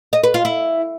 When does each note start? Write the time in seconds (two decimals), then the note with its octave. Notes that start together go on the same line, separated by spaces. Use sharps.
0.13 D#5
0.23 B4
0.34 F4
0.45 E4